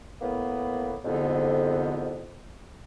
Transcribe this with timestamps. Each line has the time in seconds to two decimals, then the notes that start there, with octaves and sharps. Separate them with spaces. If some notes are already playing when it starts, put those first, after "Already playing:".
0.21 A2 A#3 B3
1.05 C2 F2 G#2 D3 B3